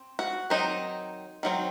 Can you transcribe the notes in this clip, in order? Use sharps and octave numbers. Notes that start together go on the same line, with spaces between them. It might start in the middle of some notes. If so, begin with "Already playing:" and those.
Already playing: C4
F#4
D#3 F#3 C4 D#4
D#3 F#3 C4